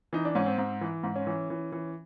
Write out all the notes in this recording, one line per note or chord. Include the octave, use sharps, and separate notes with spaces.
E3 D#4
D4
G#2 C#4
C4
G#2
E3
G#2
C#4
E3
E3
E3